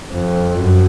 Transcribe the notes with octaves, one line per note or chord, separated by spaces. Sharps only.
F2
F#2